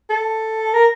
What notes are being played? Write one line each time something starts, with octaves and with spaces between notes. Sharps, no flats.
A4
A#4